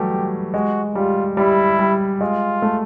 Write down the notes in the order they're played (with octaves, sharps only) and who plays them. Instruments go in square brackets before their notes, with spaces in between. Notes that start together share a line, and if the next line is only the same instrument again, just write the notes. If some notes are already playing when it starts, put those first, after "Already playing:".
Already playing: [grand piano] E3 F#3 G3 A3 [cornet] G4
[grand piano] G#3 [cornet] F#4
[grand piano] G3 [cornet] F4
[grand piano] G3 [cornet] E4
[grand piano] G3
[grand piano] G#3 [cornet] F4
[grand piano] A3